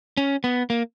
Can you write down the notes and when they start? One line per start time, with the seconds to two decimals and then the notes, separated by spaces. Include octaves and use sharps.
0.17 C#4
0.44 B3
0.70 A#3